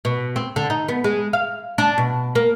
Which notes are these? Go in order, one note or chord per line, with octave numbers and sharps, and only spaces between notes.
B2
C4
D3
D#4
B3
G#3
F5
D4
B2
A#3